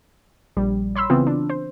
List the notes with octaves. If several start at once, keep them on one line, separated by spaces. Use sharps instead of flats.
A#1 G3
C#5 B5 C6 E6
C#3 E3 B3 C4 F4
D4
C5